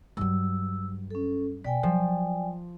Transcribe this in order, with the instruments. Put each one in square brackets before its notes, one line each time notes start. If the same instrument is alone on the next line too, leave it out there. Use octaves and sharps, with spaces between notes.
[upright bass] G2 F#3 [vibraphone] E6
[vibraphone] C#4 A4
[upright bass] B2 [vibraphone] D5 G5 G#5 [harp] B6
[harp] F3 [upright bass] F#3